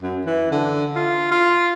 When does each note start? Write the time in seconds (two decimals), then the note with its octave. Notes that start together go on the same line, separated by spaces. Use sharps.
0.02 F#2
0.26 E3
0.51 D3
0.95 F4
1.31 F4